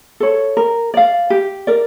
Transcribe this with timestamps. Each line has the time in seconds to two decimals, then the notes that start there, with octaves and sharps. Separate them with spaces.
0.20 A4 C#5
0.57 A#4
0.94 D5 F5
1.30 G4
1.67 A#4 D5